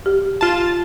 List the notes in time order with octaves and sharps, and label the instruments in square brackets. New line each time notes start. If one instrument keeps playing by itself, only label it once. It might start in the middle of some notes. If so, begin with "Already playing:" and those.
[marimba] G4
[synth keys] F4 A5